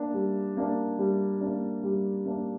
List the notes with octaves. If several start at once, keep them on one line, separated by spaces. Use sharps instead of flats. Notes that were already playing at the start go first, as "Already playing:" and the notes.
Already playing: A#3 D4
G3
A#3 D4
G3
A#3 D4
G3
A#3 D4